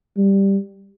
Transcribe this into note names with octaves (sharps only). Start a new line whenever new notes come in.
G3